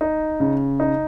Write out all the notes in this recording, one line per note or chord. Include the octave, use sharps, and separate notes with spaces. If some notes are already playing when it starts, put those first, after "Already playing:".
D#4
C#3
D#4